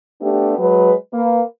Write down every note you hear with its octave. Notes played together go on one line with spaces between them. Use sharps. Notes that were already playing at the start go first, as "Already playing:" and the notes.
A3 B3 D4 G4
F#3 G#3 B4
A#3 B4